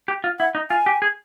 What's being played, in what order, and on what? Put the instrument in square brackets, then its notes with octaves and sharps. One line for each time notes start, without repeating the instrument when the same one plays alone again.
[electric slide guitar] G4
F4
[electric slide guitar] E4 [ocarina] F#5
[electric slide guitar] D#4
[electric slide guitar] F4 [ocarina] G#5
[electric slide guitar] G4
G#4